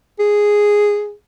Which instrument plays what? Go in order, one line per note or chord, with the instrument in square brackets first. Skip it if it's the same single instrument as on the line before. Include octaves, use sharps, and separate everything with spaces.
[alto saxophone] G#4